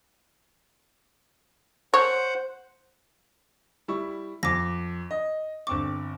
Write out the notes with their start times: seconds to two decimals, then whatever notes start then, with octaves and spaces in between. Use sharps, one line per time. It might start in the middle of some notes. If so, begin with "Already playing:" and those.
1.94 C5 C#5 F#5
3.88 G3 E4 C#6
4.43 F2 D6 A#6
5.11 D#5
5.67 G1 C4 C#6 D6